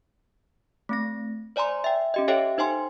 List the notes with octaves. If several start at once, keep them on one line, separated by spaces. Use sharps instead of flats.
A3 C4 A#6
C5 D5 G#5 A#5 C6
E5 G5
C#4 G4 D#5
G4 A4 C#5 E5 F5 G5
D#4 C5 G5 G#5 C6